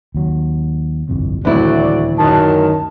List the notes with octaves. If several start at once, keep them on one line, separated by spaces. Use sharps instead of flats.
D#2 F#3
G1 C2 F2
D#1 D2 E3 F#3 A3 C4 E4 D5
F#2 D#3 A5